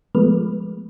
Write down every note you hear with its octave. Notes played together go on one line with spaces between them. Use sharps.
F3 G#3 A3 B3 B4